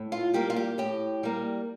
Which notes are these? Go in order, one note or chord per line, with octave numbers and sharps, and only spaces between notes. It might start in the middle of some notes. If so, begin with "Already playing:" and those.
Already playing: A2
F4
G3 A#3 G4
F4
G4
A2 G4
G3 A#3